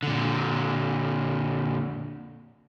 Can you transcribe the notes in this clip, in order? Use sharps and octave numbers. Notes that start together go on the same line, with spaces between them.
A#2 D3